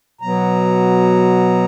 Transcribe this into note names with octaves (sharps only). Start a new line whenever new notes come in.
B2 F#3 B3 A#5